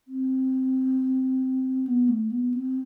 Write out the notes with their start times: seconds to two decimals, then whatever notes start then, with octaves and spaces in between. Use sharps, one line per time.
0.08 C4
1.87 B3
2.09 A3
2.31 B3
2.54 C4